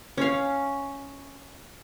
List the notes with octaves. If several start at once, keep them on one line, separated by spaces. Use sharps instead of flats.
C#4 F5